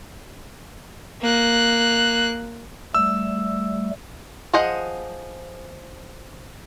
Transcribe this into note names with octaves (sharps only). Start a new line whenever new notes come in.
A#3 F#6
G3 A3 E6
F3 G#4 C5 D#5 F#5